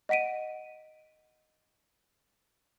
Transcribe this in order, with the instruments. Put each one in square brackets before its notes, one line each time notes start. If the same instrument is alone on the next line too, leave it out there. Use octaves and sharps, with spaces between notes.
[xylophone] D#5 F#5 B6 D7 D#7